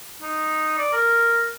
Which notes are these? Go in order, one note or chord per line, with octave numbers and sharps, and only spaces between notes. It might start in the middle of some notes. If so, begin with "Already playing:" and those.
D#4
D5
A#4